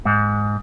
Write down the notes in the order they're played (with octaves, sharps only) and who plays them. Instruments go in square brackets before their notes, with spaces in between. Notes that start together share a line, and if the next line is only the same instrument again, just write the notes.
[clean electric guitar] G#2